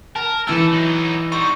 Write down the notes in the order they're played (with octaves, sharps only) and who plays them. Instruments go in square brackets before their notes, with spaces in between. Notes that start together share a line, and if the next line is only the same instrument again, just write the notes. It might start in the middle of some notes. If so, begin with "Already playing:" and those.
[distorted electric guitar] A#4 [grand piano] A5
[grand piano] E3 E6 [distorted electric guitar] A3 A4
[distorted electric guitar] F#3 D#4
[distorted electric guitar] G3 D#4 [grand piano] C#6